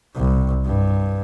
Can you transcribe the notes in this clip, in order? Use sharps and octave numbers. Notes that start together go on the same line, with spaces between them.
C2
G2